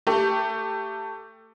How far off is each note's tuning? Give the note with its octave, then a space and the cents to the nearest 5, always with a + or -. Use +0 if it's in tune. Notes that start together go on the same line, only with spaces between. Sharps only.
A3 +20 G4 +0